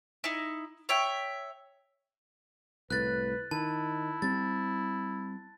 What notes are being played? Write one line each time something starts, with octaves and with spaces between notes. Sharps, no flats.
D#4 E4
C#5 E5 G5
C2 A2 B4 F#6 A6
D#3 E4 A5
G3 C4 A6